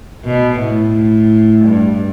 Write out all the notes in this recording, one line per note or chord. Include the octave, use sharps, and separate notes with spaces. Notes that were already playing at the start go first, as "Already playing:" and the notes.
B2
A2
G2